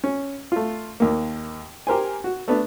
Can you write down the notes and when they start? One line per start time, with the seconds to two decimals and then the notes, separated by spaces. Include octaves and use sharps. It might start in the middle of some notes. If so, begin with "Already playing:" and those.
0.04 C#4
0.52 A3 F4
1.00 D#2 A#3
1.87 G4 A#4 C5 G#5
2.24 F#4
2.48 A3 B3 D4